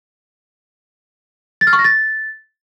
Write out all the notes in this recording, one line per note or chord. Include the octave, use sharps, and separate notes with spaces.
A6
F6
C#6
A#6
A6